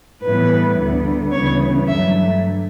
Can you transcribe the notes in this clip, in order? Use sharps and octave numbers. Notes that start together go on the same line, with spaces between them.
A2 E3 G3 B3 B4
D2 D3 G3 B3
D2 C#3 E3 G3 B3 C#5
G2 D3 F#3 A3 E5